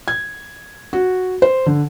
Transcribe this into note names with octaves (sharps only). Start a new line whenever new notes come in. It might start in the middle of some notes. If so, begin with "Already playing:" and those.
G#6
F#4
C5
D3